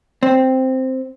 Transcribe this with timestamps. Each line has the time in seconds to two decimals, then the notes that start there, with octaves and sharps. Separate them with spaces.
0.23 C4